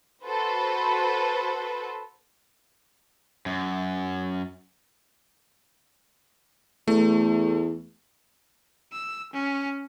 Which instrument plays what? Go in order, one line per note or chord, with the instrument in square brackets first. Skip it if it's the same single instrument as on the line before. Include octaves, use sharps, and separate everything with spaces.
[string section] F#4 A4 B4 C5
[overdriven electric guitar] F#2
[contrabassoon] E2 [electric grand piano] A3
[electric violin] E6
C#4